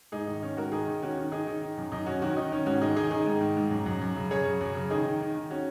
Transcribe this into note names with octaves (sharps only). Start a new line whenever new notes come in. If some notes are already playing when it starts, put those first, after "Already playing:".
G#2 D#4 G#4
D#3 D#4
D#3 C#4
G#2 F#4 A#4
D#3 D#4 G#4
D#3
D#3 C#4 F#4
D#3
D#3 D#4 G#4
D#3
D#3
F#2
F#2 D#4
F#2 C#4 F#4
D#3 C#4 F#4
D#3 D#4
D#3 C#4
G#2 C#4 F#4
D#3 D#4 G#4
D#3 D#4 G#4
D#3 D#4 G#4
G#2
D#3
G#2
F#2
F#2
F#2
C#3
F#2 G#4 C#5
C#3
F#2
C#3
D#3 D#4 G#4
D#3
D#3
D#3
C#4 F#4